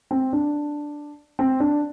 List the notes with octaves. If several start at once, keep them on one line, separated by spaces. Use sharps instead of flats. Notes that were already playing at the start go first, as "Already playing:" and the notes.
C4
D4
C4
D4